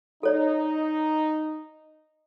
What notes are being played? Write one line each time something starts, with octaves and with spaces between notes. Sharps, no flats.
D#4 A4 C#5 D5